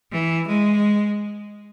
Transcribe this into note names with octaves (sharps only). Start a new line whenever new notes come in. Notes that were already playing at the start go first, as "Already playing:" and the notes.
E3
G#3